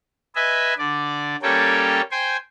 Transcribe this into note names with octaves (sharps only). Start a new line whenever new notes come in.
B4 D#5 E5 G#5
D3 D5
G3 A#3 C#4 A4 C#5 G5
C5 G5 G#5 C6